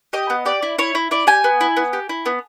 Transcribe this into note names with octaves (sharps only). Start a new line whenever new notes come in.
G4 D#5
B3
G4 D5
E4
E4 C#5
E4
E4 D5
G4 G#5
B3
E4
B3
G4
E4
B3